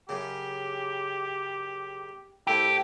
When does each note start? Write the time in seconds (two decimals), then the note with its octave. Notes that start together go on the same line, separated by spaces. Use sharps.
0.09 F#2 C#3 G4
2.47 C2 A3 E4 G4